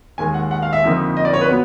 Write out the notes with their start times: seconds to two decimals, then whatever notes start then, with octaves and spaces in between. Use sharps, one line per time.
0.18 D#2 D#3 G#3 G#5
0.34 F#5
0.51 F#5
0.62 F5
0.73 E5
0.84 F2 D3 F3 A#3 D#4
1.17 D#5
1.25 D5
1.33 C#5
1.41 B4
1.49 F#3 B3